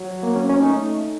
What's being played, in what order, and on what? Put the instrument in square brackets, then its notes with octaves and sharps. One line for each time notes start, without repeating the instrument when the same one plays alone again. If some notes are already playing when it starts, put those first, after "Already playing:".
Already playing: [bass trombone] F#3
[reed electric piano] A#3
C#4
C#4
[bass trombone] A3 [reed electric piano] D#4